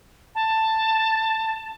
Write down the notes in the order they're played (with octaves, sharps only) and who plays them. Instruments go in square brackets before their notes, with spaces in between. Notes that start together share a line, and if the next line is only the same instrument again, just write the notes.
[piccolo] A5